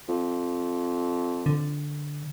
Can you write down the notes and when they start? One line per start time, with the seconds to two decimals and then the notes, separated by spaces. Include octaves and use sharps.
0.09 F2
1.46 D3